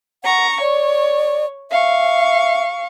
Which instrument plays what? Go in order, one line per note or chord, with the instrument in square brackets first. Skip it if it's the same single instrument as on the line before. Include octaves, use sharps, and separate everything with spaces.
[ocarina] F#5 [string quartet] A#5 C#6
[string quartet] C#5 [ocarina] D5
[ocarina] E5 [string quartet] F5 C#6